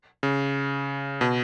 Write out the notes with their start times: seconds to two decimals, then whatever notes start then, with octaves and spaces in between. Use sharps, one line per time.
0.23 C#3
1.21 B2